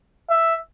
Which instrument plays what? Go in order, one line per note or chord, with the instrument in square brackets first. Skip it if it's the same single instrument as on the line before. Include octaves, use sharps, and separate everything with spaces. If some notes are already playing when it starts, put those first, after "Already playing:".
[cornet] E5